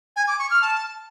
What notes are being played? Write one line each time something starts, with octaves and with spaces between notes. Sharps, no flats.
G#5
D6
C#6
F6
A5